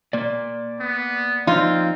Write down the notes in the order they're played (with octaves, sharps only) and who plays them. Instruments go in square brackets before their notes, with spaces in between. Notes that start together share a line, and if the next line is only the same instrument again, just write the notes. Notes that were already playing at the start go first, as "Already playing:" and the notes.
[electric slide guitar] A#3 D5
[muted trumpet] B3
[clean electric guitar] F3 D#4 [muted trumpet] C4 [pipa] F4